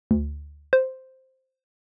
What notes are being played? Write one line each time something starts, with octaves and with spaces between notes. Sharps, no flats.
D2
C5